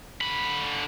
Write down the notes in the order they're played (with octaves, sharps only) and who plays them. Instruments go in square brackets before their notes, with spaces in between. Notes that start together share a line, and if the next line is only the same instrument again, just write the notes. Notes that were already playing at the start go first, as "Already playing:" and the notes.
[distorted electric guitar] D3 B5